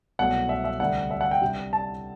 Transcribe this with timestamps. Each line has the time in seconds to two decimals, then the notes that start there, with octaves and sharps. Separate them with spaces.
0.19 C2 B2 F#3 A3 F#5
0.49 E5
0.64 E5
0.80 D2 C3 G3 D4 F#5
1.11 E5
1.21 F#5
1.31 G5
1.41 C3 G3 D4
1.73 A5